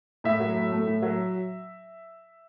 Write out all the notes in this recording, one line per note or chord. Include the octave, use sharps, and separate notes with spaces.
A2 E5
F#3
A2
A3
A2
F#3